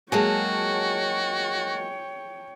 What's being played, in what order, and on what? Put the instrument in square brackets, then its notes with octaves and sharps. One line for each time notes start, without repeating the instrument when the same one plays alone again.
[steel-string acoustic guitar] F#3 G#3 A#3 [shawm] F#4 [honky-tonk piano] G#4 A5 [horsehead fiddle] C#5 G5